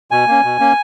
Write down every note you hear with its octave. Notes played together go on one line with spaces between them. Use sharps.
B2 G#5
A#3 C#4
B2
A#3 C#4